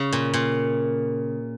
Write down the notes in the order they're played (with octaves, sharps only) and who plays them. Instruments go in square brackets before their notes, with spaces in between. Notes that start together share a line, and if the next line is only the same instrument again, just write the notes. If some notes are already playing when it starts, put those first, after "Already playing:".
Already playing: [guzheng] C#3
A#2
A#2